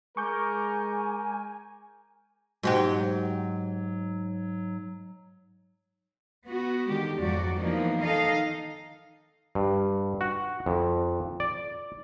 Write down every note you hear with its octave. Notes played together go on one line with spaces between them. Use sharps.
G#3 A#4 G#5 C#6 D6 G6
G#2 F#3 F#4 G4
B3 F#4
D3 D#3 G#3 G4
F2 G#2 F#3 F#4 D5
E3 F3 A#3 B3 D#4
D#3 D#4 A4 D#5 F5
G2
F#4
F2
D5